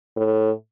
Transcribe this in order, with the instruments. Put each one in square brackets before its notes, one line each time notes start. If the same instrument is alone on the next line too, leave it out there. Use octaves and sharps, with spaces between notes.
[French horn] A2